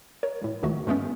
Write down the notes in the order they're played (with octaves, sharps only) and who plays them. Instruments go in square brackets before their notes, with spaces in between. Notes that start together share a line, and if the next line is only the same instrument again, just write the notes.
[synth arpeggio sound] A#4 C#5
C#2 A2
G1 C#2 D#3 A3 F#4
G2 G#3 A3 B3 C#4